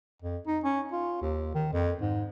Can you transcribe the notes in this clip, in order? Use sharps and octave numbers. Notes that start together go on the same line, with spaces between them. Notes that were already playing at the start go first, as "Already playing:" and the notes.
F2
D#4
C#4
F4
D#2
D#3
F2
G#2